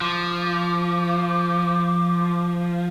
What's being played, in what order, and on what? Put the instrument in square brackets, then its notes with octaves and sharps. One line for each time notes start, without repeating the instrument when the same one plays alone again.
[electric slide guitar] F3 [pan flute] D6